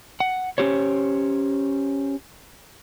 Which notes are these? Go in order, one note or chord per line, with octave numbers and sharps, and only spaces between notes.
F#5
C#4 E4 G4 C5 C#5